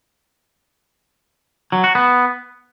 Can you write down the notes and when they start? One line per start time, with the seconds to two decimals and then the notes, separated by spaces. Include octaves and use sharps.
1.72 F#3
1.84 F#4
1.95 B3